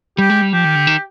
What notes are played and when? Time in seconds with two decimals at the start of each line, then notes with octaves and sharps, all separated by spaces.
0.18 G3 G4
0.30 G#3
0.42 G3
0.53 F3 G4
0.65 D#3
0.75 D3
0.87 D#3